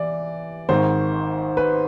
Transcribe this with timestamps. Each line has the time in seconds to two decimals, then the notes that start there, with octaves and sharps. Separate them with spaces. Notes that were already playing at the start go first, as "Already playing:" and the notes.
Already playing: E3 D5
0.69 G#1 G#2 D#3 C5
1.57 B4